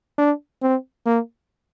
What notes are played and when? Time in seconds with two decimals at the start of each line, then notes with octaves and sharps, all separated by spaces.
0.18 D4
0.62 C4
1.06 A#3